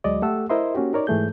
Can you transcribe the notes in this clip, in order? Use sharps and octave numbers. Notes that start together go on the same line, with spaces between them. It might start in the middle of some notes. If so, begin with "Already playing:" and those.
D2 F#3 G#3 D5 D#5
A3 G4 A4 F#5 E6
E4 A#4 C5 D#5 E5 C6
A#3 C#4 F#4 G4
D#4 A#4 C#5 D5
G#2 E3 A3 G#4 G6